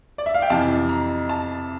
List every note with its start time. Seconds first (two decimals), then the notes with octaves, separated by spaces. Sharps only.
0.18 D5
0.26 E5
0.34 F5
0.42 G5
0.50 F2 C3 E3 A5
0.89 A#5
1.29 A5